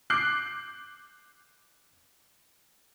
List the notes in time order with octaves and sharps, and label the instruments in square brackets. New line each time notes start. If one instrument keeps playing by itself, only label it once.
[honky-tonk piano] D6 F#6 G6 C7